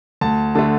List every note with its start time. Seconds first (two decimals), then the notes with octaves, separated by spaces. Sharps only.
0.21 D2 A5
0.55 D3 A3 A5